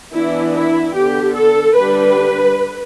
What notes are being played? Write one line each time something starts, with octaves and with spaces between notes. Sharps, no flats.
E3 B3 D4 E4
E4
D3 B3 D4 G4
A4
D3 G3 D4 B4